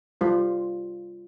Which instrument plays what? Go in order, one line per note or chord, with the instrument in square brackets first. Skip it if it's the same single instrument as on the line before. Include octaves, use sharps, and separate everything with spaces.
[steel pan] G3 F4 C5